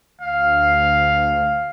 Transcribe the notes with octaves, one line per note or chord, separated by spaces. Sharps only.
D2 F5